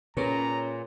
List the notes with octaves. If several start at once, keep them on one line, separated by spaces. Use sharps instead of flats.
A#2 C#4 G#4 A#4 B4 C#5 A#5